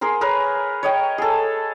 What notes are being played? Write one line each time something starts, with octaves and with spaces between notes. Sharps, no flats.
G#4 A#4 C5
G#4 A#4 B4 C#5
C#5 D#5 G5
G#4 A4